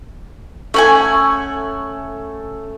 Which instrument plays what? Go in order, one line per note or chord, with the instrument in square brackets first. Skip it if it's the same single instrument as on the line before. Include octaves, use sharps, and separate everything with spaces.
[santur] A3 [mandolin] C#4 F#5 G#5